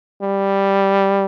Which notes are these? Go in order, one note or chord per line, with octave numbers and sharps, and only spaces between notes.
G3